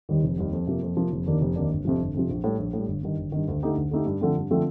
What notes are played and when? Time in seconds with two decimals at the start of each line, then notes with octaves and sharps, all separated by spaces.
0.09 D#2 D#3 G3
0.24 F1
0.38 D#2 D#3 G3
0.53 F2
0.67 C3 F3 A#3
0.82 F2
0.97 C3 F3 A#3
1.12 F1
1.26 D#2 D#3 A#3 D4
1.41 F1
1.56 D#2 D#3 A#3 D4
1.71 G1
1.85 F2 C3 F3
2.00 G1
2.14 F2 C3 F3
2.29 A#1
2.44 A2 G3
2.59 A#1
2.73 A2 G3
2.88 G1
3.03 G2 D#3
3.18 G1
3.32 G2 D#3
3.48 D2
3.63 D3 A3 D#4 G4
3.77 D2
3.91 D3 A3 D#4 G4
4.06 G2
4.21 D3 F3 A3 C4
4.36 G2
4.51 D3 F3 A3 C4